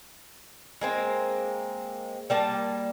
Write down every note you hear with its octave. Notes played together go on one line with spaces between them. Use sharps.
G#3 A#3 C4
G3 A#3 A5